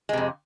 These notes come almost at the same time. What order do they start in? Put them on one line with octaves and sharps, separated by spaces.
G#3 C3 F2